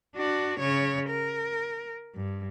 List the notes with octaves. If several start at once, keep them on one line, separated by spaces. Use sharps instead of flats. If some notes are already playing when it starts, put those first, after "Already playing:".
D4 F#4
C#3 C#5
A#4
G2